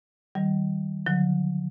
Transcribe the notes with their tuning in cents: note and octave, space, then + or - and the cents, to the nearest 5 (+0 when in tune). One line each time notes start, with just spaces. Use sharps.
D#3 +0 G3 -30
D3 +0 F#3 -35